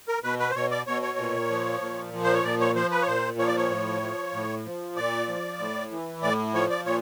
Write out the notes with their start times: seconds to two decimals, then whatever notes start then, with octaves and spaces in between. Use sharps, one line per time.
0.08 A#4
0.24 B2 B4
0.40 B4
0.50 C5
0.55 B2 C#5
0.71 D5
0.87 B2 C#5
1.02 C#5
1.18 A#2
1.51 F3
1.81 A#2
2.13 F3
2.24 C5
2.34 C#5
2.44 A#2 D5
2.60 C#5
2.75 F3 C5
2.91 B4
3.02 C#5
3.07 A#2 C5
3.39 F3 C#5
3.47 D5
3.57 C#5
3.70 A2
4.02 F3
4.34 A2
4.66 F3
4.96 A#2 D5
5.28 F3
5.59 A2
5.91 E3
6.22 A2 D5
6.54 F3 C#5
6.70 D5
6.86 A#2 C#5